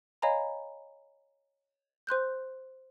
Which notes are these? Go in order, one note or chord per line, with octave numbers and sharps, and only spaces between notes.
C#5 D#5 F5 G#5 A#5 B5
C5 C6 F#6 G6